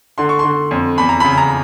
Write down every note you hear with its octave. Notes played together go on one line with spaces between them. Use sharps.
D3 C6
C#6
D3 C6
F2
E2 B5
A#5
C#3 B5
A#5